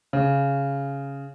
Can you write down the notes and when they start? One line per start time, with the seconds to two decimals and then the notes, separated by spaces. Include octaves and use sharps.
0.13 C#3